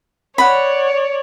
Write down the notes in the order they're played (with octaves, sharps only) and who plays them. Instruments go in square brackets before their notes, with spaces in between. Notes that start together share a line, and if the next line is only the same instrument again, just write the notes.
[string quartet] C#5 D5 [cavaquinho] F#5 B5